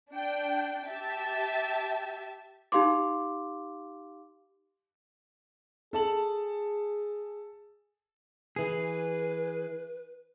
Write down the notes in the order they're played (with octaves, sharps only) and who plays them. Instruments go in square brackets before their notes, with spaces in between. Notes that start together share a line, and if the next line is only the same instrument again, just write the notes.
[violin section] D4 G5
G4 E5 A5
[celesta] D#4 G4 F5 C6 D6
[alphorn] G#4 [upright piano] A4 A5 F#7
[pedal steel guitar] E3 G#4 [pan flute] B4